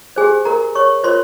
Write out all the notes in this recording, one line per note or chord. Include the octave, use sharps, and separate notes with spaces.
G4 G#4 C5 G#5
A#4 A#5
C#5 C#6
F4 A#4 C5 C#5 C6